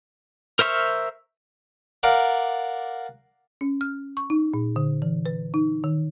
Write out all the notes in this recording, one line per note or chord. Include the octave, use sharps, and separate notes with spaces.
A#4 C5 E5 C#6 F6
A#4 D5 F5 F#5
C#4
F6
C#6
D#4
A#2
D3
E3
B4
D#4
D#3